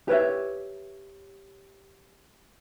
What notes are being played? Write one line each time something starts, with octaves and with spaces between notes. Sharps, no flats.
G4 B4 C#5 E5